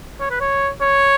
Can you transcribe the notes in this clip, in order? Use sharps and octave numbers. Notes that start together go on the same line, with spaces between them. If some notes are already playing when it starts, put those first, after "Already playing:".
C#5
B4
C#5
C#5